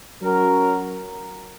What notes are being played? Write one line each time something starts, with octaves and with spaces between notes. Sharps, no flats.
F#3 C#4 F#4 A#4